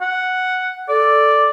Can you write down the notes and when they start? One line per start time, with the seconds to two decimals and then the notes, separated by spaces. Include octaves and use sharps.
0.01 F#5
0.89 A4 D5